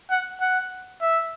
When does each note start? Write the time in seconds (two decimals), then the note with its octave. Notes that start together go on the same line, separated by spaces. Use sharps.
0.11 F#5
0.41 F#5
1.02 E5